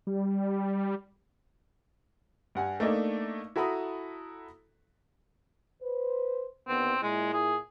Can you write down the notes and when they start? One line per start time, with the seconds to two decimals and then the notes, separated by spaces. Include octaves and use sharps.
0.07 G3
2.55 G2 F#5 G#5
2.80 A3 A#3 D4 D#4 A4
3.56 E4 F#4 A4 A#5 B5 D#6
5.82 B4 C5
6.68 D#2 D3 B3 C4
7.02 A#2 G#3 E4
7.33 G#4